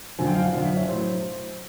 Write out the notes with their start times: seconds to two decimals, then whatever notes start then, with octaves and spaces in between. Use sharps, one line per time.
0.19 F#2 D3 F3 G#5
0.27 G5
0.35 F5
0.45 F#5
0.53 F#2 D3 F3 F5
0.65 E5
0.76 C#5
0.88 A2 F#3 C5